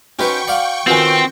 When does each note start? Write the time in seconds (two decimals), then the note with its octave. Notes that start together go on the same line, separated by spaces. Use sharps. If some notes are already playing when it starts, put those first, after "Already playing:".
0.19 C#4 D#4 F#4 B4 C5 G5 C#6
0.48 D5 F5 F#5
0.87 D#3 B3 C4 F4 F#4 G#5